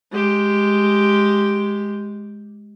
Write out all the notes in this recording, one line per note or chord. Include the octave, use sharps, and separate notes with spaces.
G#3 G4